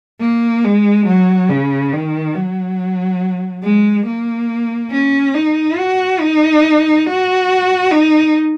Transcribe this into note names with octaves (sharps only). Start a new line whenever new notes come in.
A#3
G#3
F#3
C#3
D#3
F#3
G#3
A#3
C#4
D#4
F#4
D#4
F#4
D#4